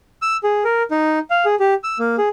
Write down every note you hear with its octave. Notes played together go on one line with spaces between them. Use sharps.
E6
G#4
A#4
D#4
F5
G#4
G4
E6
A#3
G#4